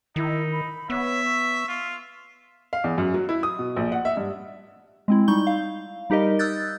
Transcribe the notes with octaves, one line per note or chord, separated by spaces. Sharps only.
D#3 D#4 E4
B5
B3 C#5 E5
C#6
F4
F5
E2
F#2
F#3
E4
D#6
B2
A#1
F#5
E5
G2
G#3 C4 E4
G3 D#4 C#6 G6 G7
F5
G3 D#4 G4 A#4 D#5
D#6 E6 F#6 G6 A6